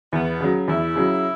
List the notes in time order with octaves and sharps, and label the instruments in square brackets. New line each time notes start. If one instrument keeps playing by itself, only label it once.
[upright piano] E2 [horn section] B3
[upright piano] C#3 F#3
[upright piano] E2 [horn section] E4
[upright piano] C#3 F#3